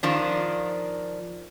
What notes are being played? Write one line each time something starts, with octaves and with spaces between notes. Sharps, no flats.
D#3 F3 D4